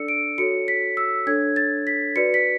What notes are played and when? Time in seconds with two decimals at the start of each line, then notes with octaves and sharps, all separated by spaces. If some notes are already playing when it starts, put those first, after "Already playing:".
Already playing: D4 A4 D5 E6 C#7
0.08 D7
0.38 F#4 A4 C#5 C#7
0.68 B6
0.97 E6
1.27 D4 A4 C#5 G#6
1.56 A6
1.87 B6
2.16 F#4 B4 D5 C#7
2.34 B6